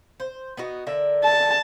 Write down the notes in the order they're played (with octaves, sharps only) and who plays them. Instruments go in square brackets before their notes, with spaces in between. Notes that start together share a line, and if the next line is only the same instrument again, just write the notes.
[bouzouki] C5
B3 D#4 F#4
D3 A#4 E5
[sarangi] A5